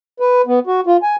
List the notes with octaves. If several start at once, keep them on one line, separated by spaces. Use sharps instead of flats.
B4
B3
F#4
F4
G#5